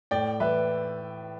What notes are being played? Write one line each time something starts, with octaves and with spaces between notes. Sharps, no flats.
A2 D5 G5
E3 B4 E5